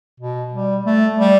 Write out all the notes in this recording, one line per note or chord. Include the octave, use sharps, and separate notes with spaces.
B2
G3
A3
G3